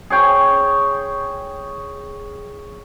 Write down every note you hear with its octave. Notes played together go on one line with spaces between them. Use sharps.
G#4 C#5 G5